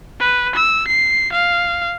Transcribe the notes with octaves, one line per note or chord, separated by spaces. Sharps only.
B4
E6
C7
F5